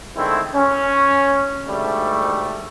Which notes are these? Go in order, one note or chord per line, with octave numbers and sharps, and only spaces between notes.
D3 D#3 G#3 A3 C4 E4
C#4
D2 G#2 G3 A3